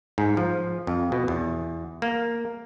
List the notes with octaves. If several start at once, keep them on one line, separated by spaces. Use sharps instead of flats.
G#2
F3
F2
B2
E2
A#3